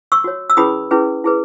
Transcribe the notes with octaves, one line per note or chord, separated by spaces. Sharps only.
C#6 E6
F#4 C#5
E6
C#4 E4 G#4 B4 B5 D#6
C#4 E4 G#4 B4
E4 G#4 B4